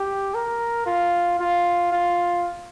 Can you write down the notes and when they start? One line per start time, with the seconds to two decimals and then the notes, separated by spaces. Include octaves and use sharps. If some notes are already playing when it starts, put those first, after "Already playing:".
Already playing: G4
0.34 A#4
0.86 F4
1.39 F4
1.92 F4